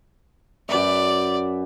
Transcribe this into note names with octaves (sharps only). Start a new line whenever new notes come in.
F#2 B4 D5 E5